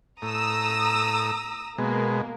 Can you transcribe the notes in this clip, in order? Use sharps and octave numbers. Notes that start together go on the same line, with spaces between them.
A2 A#5 D#6 E6
B2 G#3 A#3